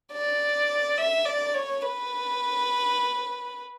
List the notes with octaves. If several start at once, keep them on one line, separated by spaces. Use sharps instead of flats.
D5
E5
D5
C#5
B4